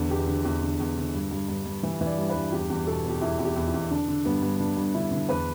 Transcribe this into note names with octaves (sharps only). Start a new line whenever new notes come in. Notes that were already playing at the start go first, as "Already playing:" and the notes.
Already playing: E2 D3 B3
E2 G4
D3
E2
D3
E2
D3
G2
G2
G2
G2
E3
E3
D5
G2
B4
G2
E2 G4
E2
B2 A4
B2
G4
E2 E4
E2
G4
E2
E4
E2
D3 D4
D3
G2 B3
G2
D3 D4
G2
D3 E4
D3
E2 B4